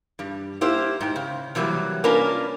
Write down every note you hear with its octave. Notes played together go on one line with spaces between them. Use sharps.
G2 G3
A#3 E4 G4 C5
G#2 G5
C#3
C3 E3 F#3 G3 A#3
A#3 C#4 D4 F4 A#4 B4